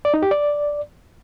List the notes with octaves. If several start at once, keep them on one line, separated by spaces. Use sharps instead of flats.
D5
D#4
G4
D5